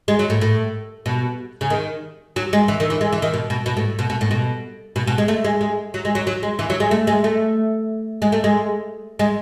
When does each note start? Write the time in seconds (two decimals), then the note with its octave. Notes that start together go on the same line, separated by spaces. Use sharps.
0.08 G#3
0.19 F#3
0.30 A2
0.41 A2
1.06 B2
1.61 C#3
1.70 D#3
2.36 F#3
2.53 G#3
2.68 E3
2.80 D#3
2.90 E3
3.01 G#3
3.12 E3
3.22 D#3
3.34 B2
3.50 B2
3.66 B2
3.77 A2
3.99 B2
4.10 B2
4.21 A2
4.31 B2
4.96 B2
5.07 B2
5.18 G#3
5.28 A3
5.44 G#3
5.61 G#3
5.94 F#3
6.05 G#3
6.15 F#3
6.27 F#3
6.43 G#3
6.59 E3
6.70 F#3
6.80 G#3
6.91 A3
7.07 G#3
7.24 A3
8.22 G#3
8.32 A3
8.44 G#3
9.19 G#3